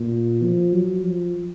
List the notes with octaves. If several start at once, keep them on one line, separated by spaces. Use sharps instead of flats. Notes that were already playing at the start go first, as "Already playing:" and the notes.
Already playing: A#2
F3
F#3
F3